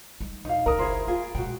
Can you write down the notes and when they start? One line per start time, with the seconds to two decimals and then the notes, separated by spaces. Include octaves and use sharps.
0.20 G3 D#4
0.45 E1 D#4 F5
0.66 C#2 C#3 A#4 D#6
0.79 F#1 E4 G#4 C5
1.07 A#3 F4 G#4
1.35 B2 G#3 F#4 G5